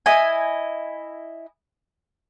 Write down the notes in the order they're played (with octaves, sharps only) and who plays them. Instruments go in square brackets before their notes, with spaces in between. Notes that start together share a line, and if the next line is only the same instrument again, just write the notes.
[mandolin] E4 D#5 G#5